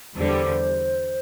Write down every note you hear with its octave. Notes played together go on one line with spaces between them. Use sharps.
E2 D3 G3 C5